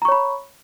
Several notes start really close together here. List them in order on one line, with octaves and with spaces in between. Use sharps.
A#5 C#6 C#5 B5